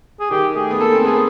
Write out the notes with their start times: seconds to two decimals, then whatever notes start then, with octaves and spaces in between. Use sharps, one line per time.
0.20 G#4
0.31 D#3 G4
0.55 A3 G#4
0.70 B3
0.80 A#3 A4
0.93 C4
1.04 B3 G#4